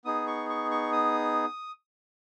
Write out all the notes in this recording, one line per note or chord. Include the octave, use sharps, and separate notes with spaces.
B3 D#4 G#4 D#6
C#6
C#6
C#6
D#6